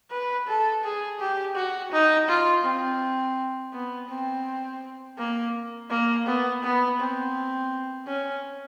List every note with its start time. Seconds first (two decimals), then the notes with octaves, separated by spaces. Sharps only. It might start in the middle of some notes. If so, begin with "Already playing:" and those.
0.11 B4
0.48 A4
0.84 G#4
1.20 G4
1.56 F#4
1.92 D#4
2.29 F4
2.64 C4
3.73 B3
4.09 C4
5.19 A#3
5.90 A#3
6.27 B3
6.63 B3
6.99 C4
8.08 C#4